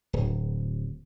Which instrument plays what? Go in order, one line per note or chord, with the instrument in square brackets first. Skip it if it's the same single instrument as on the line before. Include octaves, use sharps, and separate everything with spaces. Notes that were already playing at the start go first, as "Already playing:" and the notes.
[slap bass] D1